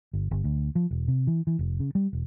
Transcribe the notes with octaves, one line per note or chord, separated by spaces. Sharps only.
G1
G1
D2
F3
E1
C3
E3
E3
F1
C#3
G3
E1